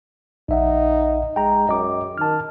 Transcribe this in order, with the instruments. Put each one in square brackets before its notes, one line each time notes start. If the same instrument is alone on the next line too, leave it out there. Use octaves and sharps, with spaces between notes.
[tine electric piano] A#1 E5 F#5 [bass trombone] D#4
[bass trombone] G#3 [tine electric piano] G5 A#5
[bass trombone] F#2 [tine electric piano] D#5 D6
[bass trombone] D#3 [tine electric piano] A5 F6